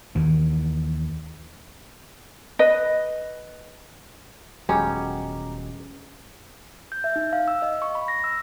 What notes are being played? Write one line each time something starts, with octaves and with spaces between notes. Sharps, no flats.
D#2 D#3 E3
B4 D#5
D#1 F#3 G#3 B3 C#4 G4 A#5 D6
G6
E5
D#4
F5
E6
D#5
C#6
B5
A#6
E6